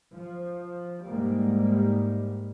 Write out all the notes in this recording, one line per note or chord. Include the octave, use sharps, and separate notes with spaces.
F3
G#2 G3 A#3